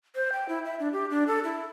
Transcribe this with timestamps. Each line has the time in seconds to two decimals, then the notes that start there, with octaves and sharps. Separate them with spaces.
0.15 C5
0.32 G5
0.49 E4
0.65 E5
0.80 D4
0.93 G4
1.10 D4
1.27 A4
1.44 E4